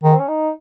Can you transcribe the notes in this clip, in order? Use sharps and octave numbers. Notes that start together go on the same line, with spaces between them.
D#3 G#3
C4
C#4
D#4